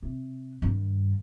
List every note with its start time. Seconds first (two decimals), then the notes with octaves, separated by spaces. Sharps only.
0.03 C3
0.62 G2 D#3